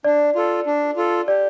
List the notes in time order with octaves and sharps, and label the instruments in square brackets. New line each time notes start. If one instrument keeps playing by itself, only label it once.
[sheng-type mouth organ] D4 [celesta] D5
[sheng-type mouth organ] F4 A4
D4
F4 A4
[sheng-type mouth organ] G4 [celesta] D5